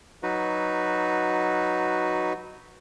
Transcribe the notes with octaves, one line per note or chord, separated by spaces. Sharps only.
F#3 D#4 F#4 B4